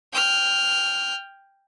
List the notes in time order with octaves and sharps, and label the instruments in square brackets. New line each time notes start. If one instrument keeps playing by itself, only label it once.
[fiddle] G5 F6